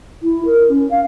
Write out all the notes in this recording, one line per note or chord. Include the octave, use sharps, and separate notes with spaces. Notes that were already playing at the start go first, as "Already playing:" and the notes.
E4
A#4
C#4
F5